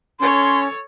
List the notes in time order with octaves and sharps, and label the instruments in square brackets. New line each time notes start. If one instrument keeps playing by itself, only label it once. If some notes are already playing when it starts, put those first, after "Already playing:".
[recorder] C#4 [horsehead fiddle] A4 C#5 [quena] C6